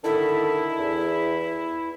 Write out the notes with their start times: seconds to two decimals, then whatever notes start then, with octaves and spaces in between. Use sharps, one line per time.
0.04 D3 D#3 E4 A4
0.79 E2